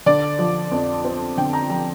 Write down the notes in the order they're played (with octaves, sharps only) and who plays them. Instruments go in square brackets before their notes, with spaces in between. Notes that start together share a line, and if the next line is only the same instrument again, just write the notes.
[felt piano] D3 D5
F3
F2
C4
D3 G5
A#5
F3 A#5